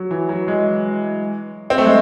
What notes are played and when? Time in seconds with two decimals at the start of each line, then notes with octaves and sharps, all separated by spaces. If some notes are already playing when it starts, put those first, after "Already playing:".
Already playing: F#3
0.11 E3
0.29 F#3
0.48 G#3
1.70 C4
1.78 A3
1.86 G#3